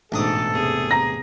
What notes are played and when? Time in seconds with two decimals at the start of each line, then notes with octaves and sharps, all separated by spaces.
0.12 A1 G#2 B2 D4 A4 D#6
0.51 E2 C3 G#4
0.91 A#5 A#6